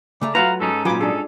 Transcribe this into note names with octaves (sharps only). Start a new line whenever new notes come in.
C#3 A3 D5 A#5
F#3 A3 F4 B4 F5 F#5 A#5
G#2 C#4 D#4 A4
A#2 F#3 F4 B4 G#5 D6
D4 G#4 A4